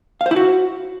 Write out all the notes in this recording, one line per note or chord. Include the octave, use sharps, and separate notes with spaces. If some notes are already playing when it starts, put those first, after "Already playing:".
F5
C5
E4
F#4